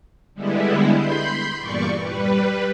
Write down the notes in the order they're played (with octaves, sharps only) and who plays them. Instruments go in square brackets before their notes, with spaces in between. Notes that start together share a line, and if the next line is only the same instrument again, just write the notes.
[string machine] D3 G3 G#3 B3 E4
B5 C6 G6
E2 G2 A#2 D5 C#6
G3 B4